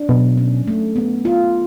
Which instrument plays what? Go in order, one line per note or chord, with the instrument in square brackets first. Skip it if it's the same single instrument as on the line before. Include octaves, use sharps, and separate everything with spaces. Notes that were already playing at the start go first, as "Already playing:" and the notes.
Already playing: [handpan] D4
[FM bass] B2 [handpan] F#3
[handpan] C#4
A3
B3
F4